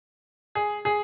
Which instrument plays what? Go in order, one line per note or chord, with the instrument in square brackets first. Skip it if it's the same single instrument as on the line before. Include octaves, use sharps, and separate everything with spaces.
[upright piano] G#4
G#4